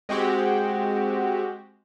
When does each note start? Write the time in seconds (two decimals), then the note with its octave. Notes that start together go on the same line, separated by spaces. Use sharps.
0.09 G#3 C4 F#4 G4